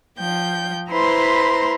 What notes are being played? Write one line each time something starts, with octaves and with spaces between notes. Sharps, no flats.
F3 G5 G6
E4 B4 C5 A#5 C6